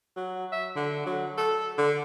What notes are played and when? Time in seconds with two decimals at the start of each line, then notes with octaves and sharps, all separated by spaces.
0.16 F#3
0.52 E5
0.76 D3
1.06 F#3
1.38 A4
1.78 D3